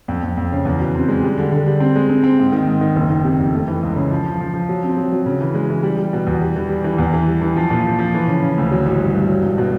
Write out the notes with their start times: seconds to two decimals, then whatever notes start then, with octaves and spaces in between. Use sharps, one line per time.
0.08 F2
0.23 F2
0.37 F2
0.52 C#3
0.65 E2
0.80 B2
0.95 C4
1.08 G#3
1.23 G3
1.38 D3
1.52 D3
1.66 G3
1.80 C4
1.96 G#3
2.09 C4
2.24 C4
2.39 G#2
2.52 D#3
2.67 G#2
2.81 D#3
2.96 F#1
3.10 D#3
3.24 C3
3.40 F2
3.54 A3
3.68 E3
3.83 C#2
3.96 C#3
4.12 F3
4.26 F3
4.40 F3
4.54 F3
4.69 F#3
4.84 C4
4.97 F#3
5.12 F#3
5.26 C#3
5.41 E3
5.55 G#3
5.70 E3
5.83 G3
5.98 G3
6.13 B2
6.27 E2
6.42 G3
6.56 E3
6.69 G3
6.84 E3
6.98 E2
7.14 E3
7.27 G3
7.41 E3
7.56 F3
7.70 A#2
7.85 F3
7.99 F3
8.14 E3
8.27 C#3
8.42 C#3
8.57 D2
8.72 F#3
8.86 A1
9.00 G2
9.14 G2
9.28 F#3
9.43 E1
9.58 B2